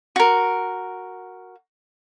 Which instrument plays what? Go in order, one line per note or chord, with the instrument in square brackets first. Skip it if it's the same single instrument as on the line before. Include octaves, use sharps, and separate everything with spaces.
[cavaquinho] F#4 A#4